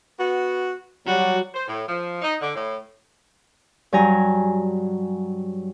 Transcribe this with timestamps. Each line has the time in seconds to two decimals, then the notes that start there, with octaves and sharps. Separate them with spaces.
0.19 B3 F#4
1.07 F#3 G3 F#4
1.55 C5
1.67 A2
1.87 F3
2.22 D#4
2.40 D3
2.55 A2
3.92 G2 F#3 G#5 A#5